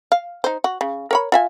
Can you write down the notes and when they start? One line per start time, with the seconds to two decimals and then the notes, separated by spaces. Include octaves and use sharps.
0.12 F5
0.44 D#4 C5
0.64 F#4
0.81 C#3
1.11 A#4 C#5 B5
1.32 F4 E5 G#5